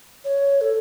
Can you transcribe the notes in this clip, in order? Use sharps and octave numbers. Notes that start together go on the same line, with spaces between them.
C#5
A4